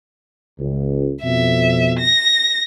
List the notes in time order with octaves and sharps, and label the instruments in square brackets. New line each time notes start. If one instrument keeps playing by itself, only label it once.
[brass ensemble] C#2
[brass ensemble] F2 B2 [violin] E5
[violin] A#6